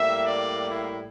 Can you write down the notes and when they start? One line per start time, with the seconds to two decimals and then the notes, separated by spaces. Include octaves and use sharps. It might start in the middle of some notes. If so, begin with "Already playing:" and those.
Already playing: A2 G3 A#3 E5
0.26 D5
0.70 E4